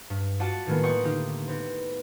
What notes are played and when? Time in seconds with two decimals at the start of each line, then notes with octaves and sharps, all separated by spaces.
0.10 G2
0.40 F4 F#4 D5 F#5 A5
0.67 A2 D#3 G#3 A#3 B3
0.83 D5 D#5 F#5 G5 C6 C#6
1.04 D3 D#4 F4 G4
1.48 B3 C4